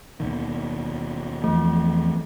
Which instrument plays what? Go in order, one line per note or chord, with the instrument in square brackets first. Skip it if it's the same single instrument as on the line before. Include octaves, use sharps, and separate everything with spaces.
[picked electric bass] D#2 B2 D#3
[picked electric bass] E2 F3 [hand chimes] A3